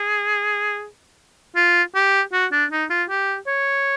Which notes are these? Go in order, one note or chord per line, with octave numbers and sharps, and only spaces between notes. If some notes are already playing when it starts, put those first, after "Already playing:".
Already playing: G#4
F4
G4
F#4
D4
D#4
F4
G4
C#5